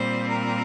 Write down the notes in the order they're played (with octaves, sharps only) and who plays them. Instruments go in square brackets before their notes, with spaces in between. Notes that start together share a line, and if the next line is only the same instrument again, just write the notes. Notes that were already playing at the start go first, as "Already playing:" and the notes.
Already playing: [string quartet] A#2 G3 C4 C5
A#4